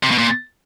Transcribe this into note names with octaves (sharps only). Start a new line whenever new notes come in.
C3
B2
A#2